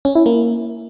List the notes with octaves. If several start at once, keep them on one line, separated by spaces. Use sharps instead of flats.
C#4
E4
A#3